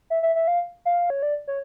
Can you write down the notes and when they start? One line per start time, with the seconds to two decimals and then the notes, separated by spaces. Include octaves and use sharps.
0.10 E5
0.23 E5
0.35 E5
0.48 F5
0.85 F5
1.10 C#5
1.23 D5
1.48 C#5